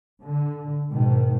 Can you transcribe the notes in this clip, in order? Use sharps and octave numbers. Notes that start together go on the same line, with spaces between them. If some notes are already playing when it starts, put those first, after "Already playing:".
D3
G#2 B2 D#3